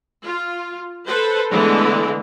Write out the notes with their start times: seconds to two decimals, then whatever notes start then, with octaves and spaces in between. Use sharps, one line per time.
0.22 F4
1.04 A4 B4 C5
1.49 D3 E3 G#3 A3 B3